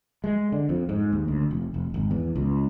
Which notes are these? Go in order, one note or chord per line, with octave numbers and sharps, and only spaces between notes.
G#3
D3
F2
G#2
D#2
D2
F1
F1
G#1
E2
C#2